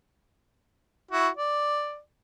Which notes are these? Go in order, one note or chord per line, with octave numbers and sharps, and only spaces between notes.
E4 F#4
D5